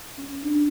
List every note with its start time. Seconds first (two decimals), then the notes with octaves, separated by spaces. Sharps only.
0.18 C#4
0.43 D4